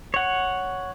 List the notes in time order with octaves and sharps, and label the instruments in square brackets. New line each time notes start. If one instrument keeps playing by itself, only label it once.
[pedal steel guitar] C#5 F#5